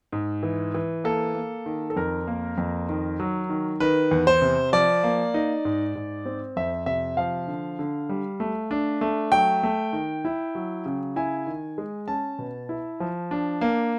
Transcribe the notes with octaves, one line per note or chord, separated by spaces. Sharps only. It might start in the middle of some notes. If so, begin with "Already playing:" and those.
G#2
E3
E3
A#3 A4
A#3
D#3
A4
F2 A#4
A#3
F2
D#3
F#3
D#3
D#3 B4
E2
C5
C3
F3 D5
A#3
D#4
G#2
G#2
C4
F2 E5
C3 E5
F3 F5
D3
D3
G3
A3
D4
A3
F#3 G5
A3
D#3
E4
F#3
C#3
E4 G#5
D#3
G#3
C#4 A5
B2
E4
F3
D4
A#3